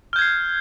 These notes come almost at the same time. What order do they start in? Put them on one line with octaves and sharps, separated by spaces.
F6 G6 G#6 C7